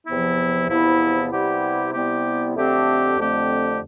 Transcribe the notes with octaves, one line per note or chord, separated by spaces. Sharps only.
E2 C3 F3 B3 E4
E2 C3 F3 B3 E4
C3 G3 B3 E4 G4
C3 G3 B3 E4 G4
F2 D3 A3 C4 G4
F2 D3 A3 C4 G4